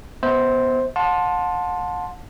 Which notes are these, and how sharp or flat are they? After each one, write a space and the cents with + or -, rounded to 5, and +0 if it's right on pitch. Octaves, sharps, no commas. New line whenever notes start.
B3 +0 C5 +0 E5 -40
F#5 -45 A5 +0 C6 +0